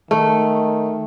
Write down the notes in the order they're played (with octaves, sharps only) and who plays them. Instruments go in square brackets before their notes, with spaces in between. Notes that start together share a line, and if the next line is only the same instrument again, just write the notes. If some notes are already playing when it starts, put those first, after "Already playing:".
[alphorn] D#3 [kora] A3